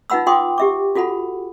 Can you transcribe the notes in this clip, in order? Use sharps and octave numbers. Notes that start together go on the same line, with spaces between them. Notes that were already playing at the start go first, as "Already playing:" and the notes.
D#4 F4 B4 F#5 B5 E6
F4 F#5 G5 C6 D6 D#6
G4 E5 D6
F4 F#4 A4 F#5 B5